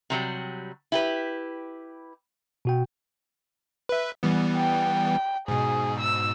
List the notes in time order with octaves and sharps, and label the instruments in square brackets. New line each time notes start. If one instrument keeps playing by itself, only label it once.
[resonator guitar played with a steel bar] C3 F#3 G3
E4 G4 B4
[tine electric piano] B2 F#4 G5
[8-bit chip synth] B4 E5
E3 G3 B3
[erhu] G5
[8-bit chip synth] G#2 B2 [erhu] G#4
[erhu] E6